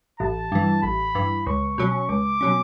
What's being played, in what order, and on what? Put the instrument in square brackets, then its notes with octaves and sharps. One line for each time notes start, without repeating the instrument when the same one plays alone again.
[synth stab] A1 [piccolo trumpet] A5
[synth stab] G2 E3
[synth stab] A1 [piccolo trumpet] B5
[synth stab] G2 E3
[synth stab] C#2 [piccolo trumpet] C#6
[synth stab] B2 F#3 C#4
[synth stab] C#2 [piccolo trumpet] D6
[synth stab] B2 F#3 C#4